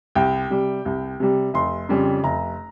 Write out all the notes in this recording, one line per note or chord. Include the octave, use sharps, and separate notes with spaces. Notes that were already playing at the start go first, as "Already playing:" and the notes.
C2 G5
C3 G3
C2
C3 G3
F1 C6
F2 C#3 G3
F1 A#5